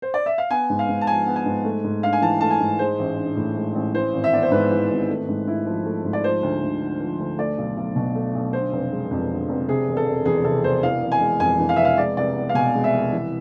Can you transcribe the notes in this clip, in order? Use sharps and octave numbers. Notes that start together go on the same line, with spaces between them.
C5
D5
E5
F5
B3 G#5
G#2
F5
G#2
A5
F3 G#5
B3
G#5
G#2
A3
G#2
D4 F5
G#5
E3 A5
A3 A5
G#5
G#2
G#3 C5
A1
D4
A2
G#3
A1
E3 C5
G#1
E5
B3 D5
C5
G#2 B4
E3
G#1
A3
G#2
E4
F3
A3
G#2
D5
F3 C5
D2
D2
D3
F3
D2
A3 D5
B1
B1
B2
A3
B1
D3 C5
F1
G#3
F2
D3
F1
C3 G#4
E1
A4
E1
E2 G#4
C3 A4
E1 C5
E3 F5
F1
G#5
G#3
F2 G#5
E3
F5
F1 E5
F5
G#3 D5
C2 D5
B3
F5
B2 G#5
G#3
E5
C2
E3